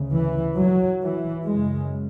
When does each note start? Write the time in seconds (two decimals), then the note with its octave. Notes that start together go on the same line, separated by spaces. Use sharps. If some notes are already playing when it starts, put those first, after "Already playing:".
Already playing: D2 C#3
0.14 E3
0.58 F#3
1.02 E3
1.47 F#2 C#3 G#3